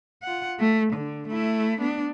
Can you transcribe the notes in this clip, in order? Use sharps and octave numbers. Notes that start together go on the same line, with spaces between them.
F4 F#5
A3
D3
A3 E4
B3 D4